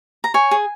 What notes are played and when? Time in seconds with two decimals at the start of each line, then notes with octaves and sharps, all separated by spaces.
0.24 A#5
0.34 C#5 G#5
0.51 G#4